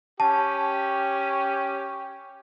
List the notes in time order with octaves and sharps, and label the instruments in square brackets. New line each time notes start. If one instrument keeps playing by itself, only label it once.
[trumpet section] C#4 G4 [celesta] A5